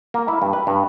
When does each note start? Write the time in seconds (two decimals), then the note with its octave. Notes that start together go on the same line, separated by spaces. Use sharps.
0.14 A#3
0.28 E4
0.42 G2
0.53 B4
0.67 G2